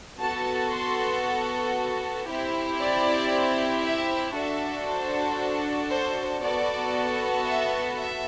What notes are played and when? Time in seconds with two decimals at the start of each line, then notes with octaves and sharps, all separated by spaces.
0.19 B3 F#4 A4 A5
0.70 C6
2.26 C4 E4 G4
2.79 D5
3.83 E5
4.34 D4 F#4 A4 E5
4.86 C5
5.90 C5
6.42 B3 F#4 A4 D5
7.46 E5
7.98 E5